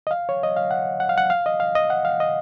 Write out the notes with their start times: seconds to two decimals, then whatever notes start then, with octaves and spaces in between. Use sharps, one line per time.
0.07 D#5
0.11 F5
0.29 C#5
0.43 D#5
0.56 F5
0.71 F#5
1.00 F#5
1.09 F5
1.18 F#5
1.30 F5
1.46 D#5
1.60 F5
1.75 D#5
1.90 F#5
2.05 F5
2.20 D#5